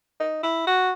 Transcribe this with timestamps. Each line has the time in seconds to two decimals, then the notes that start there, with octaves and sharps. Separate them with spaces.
0.20 D#4
0.43 E4
0.67 F#4